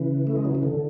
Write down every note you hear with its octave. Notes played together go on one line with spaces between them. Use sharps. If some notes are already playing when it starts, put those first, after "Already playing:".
Already playing: C#3 E3
A3
G#3
F#3
E3
D3